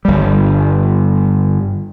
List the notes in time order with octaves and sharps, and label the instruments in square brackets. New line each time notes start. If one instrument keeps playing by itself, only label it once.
[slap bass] G1 G3